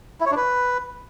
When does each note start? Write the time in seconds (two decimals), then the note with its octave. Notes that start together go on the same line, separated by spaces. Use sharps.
0.21 E4
0.26 C#5
0.31 D4
0.37 B4